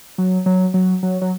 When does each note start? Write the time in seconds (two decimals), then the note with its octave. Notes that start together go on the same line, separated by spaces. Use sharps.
0.18 F#3
0.46 F#3
0.74 F#3
1.03 F#3
1.21 F#3